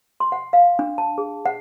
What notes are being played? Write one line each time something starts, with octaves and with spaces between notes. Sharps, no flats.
C6
F#5
F5
D4
A5
G#4
F#5